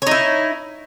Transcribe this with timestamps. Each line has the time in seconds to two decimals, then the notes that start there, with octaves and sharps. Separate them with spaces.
0.02 C#5
0.07 D#4
0.11 E4